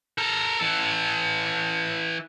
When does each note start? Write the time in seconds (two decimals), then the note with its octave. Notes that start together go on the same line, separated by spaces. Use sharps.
0.18 A4 A#4
0.59 E3 A4